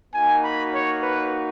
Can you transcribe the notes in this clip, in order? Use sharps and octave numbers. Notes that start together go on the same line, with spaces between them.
A#3 D#4 F#4 G#5
B5
C#5
B4